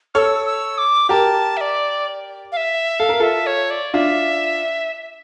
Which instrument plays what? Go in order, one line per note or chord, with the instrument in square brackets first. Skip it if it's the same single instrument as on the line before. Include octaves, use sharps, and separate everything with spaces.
[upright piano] A4 C#5 [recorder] E6 F6
[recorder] E6
D6
[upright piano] G4 A#4 [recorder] A5
[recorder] E5
D5
F5
E5
[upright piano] A4 [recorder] F5
[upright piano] A#4
[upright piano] F4 A4 [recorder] E5
[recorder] C#5
D5
[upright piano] D4 F4 [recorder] E5